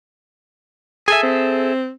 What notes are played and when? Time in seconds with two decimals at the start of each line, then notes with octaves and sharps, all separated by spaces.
1.08 G#4 A4 E5 G#5
1.23 C4